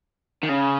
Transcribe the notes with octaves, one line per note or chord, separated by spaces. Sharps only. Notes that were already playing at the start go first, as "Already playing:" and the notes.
D#3
C#3